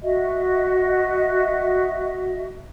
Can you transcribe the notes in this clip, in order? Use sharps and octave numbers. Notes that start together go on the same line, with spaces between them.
F#4 D#5 E5